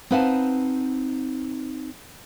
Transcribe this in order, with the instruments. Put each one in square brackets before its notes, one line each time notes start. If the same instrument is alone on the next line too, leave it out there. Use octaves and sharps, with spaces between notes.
[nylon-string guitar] C4 D#4 B4 F5 F#5 A5